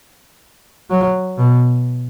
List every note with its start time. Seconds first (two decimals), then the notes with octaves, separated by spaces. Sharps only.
0.90 F#3
1.38 B2